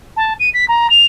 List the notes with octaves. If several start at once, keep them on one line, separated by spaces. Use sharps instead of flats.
A5
D#7
B6
A#5
F7